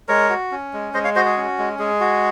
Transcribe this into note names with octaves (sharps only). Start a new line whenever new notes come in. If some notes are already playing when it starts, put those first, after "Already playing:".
G#3 A#4 C#5
F#4
C#4
G#3
G#3 C5 D#5
C#5 F5
F#4 C5 D#5
G#4
C#4
G#3
G#3 G#4
F#4